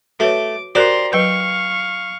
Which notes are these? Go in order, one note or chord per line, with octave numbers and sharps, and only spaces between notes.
A3 F#4 B4 C#5 D6
F#4 G4 A#4 C5 D5 A#5 C6
F#3 B4 F5 G5 C#6